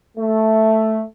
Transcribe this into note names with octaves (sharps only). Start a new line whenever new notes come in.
A3